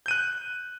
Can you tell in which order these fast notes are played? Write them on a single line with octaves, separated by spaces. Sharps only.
G6 D#7 F#6